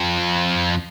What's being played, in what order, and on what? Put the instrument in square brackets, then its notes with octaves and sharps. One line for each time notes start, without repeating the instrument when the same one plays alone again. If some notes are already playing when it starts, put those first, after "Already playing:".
Already playing: [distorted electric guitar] F2